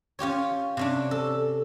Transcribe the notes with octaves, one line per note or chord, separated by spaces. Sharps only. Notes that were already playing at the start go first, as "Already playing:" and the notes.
C#4 F4 G4 C#5
C3 C#4 D4
A4